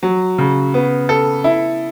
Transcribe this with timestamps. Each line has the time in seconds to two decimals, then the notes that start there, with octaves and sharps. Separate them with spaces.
0.03 F#3
0.38 C#3
0.74 B3
1.09 A4
1.44 E4